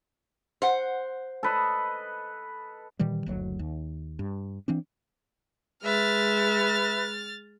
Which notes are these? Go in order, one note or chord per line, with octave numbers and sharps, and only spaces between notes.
C5 F#5
A4 B4 D#5
A#2 D#3 E3 G3
F#1 D2 F#3
D#2
G2
E3 C4 D4
G#3 B4 E5 F6 A6